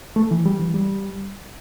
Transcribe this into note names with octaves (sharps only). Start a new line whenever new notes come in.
A3
E3
G3
E3
G3